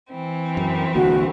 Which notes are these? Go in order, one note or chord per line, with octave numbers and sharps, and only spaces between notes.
E3 C4
F#2
C2 D3 A#3 F#4